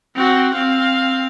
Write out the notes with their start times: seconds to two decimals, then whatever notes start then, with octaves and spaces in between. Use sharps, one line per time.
0.16 C4 F#4
0.54 C4 F5